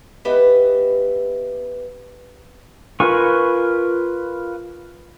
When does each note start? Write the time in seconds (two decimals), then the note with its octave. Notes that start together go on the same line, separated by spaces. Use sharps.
0.25 B3 G4 B4 D#5 E5
3.00 F4 A#4 B4 G#5 C#6